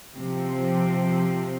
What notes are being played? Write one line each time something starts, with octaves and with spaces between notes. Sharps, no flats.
C3 F3 C4